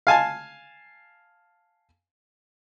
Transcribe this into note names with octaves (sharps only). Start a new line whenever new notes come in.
F5 G#5 A5